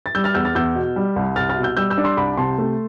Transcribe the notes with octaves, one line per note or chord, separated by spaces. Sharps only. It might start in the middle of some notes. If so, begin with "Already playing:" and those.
A6
G3 E6 G6
F6 A6
E2 E6 G6
F6 A6
E2 E6 G6
B2
G3
C2
C2 F6 A6
F6 A6
B2
E6 G6
G3 E6 G6
E6 G6
D4
C6 E6
C2 B5 D6
C3 A5 C6
A3